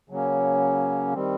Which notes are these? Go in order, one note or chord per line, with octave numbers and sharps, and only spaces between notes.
C#3 F#3 A#3 C#4
D#3 G3 C4